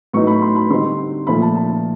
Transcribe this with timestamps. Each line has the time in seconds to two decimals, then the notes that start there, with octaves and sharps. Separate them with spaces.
0.13 A2 F#3 B3 D#4 C#6
0.27 B5
0.42 C6
0.56 B5
0.70 D3 G3 C4 D#4 C6
1.27 A#2 F3 A3 B5
1.42 A5
1.55 A5